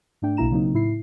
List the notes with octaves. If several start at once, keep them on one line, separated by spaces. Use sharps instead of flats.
G#2 A3 D4 G5
B1 B2 A#3 E4 A#5 E7
C#3 F#3 A#3 C4 D#4
A2 E4 C7